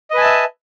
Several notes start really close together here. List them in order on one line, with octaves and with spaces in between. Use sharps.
D#5 B4 G#5 A5 E5